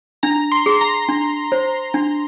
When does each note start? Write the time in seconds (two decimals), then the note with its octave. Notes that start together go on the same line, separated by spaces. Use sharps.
0.23 D4 A#5
0.52 C6
0.66 G#4
0.81 A#5
1.09 D4
1.52 C5
1.94 D4